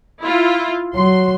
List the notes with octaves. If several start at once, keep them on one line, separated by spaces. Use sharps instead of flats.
E4 F4
F#3 C6